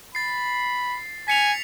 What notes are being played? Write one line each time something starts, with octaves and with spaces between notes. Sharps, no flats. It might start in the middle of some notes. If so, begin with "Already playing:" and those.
B5 A6 C7
G#5 B6 C#7 F7